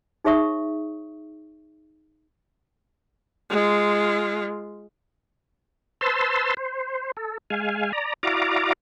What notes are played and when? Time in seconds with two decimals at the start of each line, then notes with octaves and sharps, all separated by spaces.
0.24 D#4 G#4 C#5 E5 C#6 D#6
3.50 G#3 F4
6.01 B4 C5 A5 C6 E6
6.57 C5
7.17 A4
7.50 G#3 F5 G#5
7.93 D5 A#5
8.23 E4 F#4 D5 F5 A#5 D6